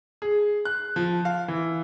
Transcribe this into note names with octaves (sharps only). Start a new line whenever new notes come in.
G#4
F#6
F3
F5
E3